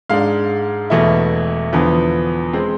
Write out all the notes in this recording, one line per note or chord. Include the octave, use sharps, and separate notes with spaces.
G#2 G#3 D4 F5
E1 E2 B2 A3 E4
E2 D3 F3 B3
G#3 C4